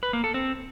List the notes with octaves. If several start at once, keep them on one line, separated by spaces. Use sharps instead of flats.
B4
A#3
A4
C4